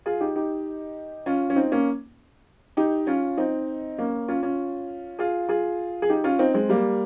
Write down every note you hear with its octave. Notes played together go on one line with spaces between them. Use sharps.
F4 G#4
D#4 G4
D#4 G4
C#4 F4
C#4
C4 D#4
A#3 C#4
D#4 G4
C#4 F4
C4 D#4
A#3 C#4
C#4 F4
C#4 F4
F4 G#4
F4 G#4
G#4
D#4 G4
C#4 F4
C4 D#4
G#3 C4
G3 A#3